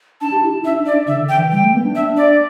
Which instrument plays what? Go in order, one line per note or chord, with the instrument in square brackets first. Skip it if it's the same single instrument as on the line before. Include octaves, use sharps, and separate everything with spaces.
[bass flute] D4 [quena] A5
[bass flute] G4
E4
E4
[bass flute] D4 [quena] E5
[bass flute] D4
[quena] D5
[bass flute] D4
[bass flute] D3 [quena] E5
[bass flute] D3
[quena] G5
[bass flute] E3
[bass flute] G3 [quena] G5
[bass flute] A3
B3
D4
[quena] E5
D5